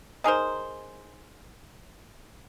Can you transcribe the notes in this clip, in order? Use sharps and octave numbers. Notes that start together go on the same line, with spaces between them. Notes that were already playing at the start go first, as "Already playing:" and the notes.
D#4 G#4 A#4 C5